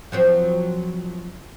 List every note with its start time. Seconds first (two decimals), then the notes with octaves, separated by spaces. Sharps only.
0.12 F3 F#3 C4